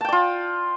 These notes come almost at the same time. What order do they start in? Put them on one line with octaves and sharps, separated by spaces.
A5 G5 D5 F4